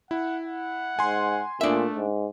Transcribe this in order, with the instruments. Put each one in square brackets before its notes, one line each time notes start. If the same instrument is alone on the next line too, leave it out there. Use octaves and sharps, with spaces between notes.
[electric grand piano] E4 [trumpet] F#5
[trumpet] F#5
[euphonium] G#2 [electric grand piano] G#5 C6
[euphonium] A#2 [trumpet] A3 [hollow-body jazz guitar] D4 E5
[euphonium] G#2